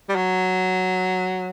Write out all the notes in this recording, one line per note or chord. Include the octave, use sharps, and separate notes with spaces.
G3
F#3